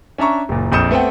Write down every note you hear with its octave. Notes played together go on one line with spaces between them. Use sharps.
C#4 D4 E5 A#5 C#6
F#1 A#2
A#1 F2 D#6 G6 C#7 E7
A3 B3 C4 F#5 G5